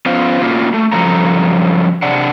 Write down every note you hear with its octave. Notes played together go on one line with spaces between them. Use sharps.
B3 C#4 F4 C5 F5
A3 A#3 C#4 F4 F#4
A3
G2 C#3 F3 F#3 A4 A#5
C3 D4 F#5